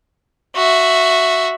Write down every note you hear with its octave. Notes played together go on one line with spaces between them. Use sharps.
F#4 E5